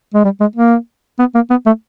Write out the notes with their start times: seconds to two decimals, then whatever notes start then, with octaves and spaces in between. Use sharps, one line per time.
0.14 G#3
0.24 G3
0.40 G#3
0.56 A#3
1.19 B3
1.35 A#3
1.50 B3
1.66 A3